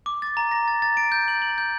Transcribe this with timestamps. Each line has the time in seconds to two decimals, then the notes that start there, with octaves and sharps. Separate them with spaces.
0.06 D6
0.22 A6
0.37 A#5
0.51 A#6
0.68 A6
0.82 A6
0.97 D7
1.12 G6
1.28 F#7
1.42 F#7
1.58 G6